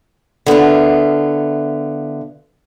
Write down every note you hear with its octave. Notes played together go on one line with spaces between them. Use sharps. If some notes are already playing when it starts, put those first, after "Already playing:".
D3 B3 E4 F4